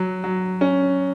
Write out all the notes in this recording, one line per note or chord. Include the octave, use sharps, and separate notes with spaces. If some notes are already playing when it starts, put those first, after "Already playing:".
Already playing: F#3
F#3
C#4